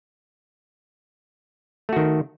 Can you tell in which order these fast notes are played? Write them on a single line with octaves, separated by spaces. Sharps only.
A3 F#4 D#3